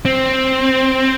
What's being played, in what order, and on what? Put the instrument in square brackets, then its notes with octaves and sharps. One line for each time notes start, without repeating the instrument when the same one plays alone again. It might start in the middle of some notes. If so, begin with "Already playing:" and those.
[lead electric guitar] C4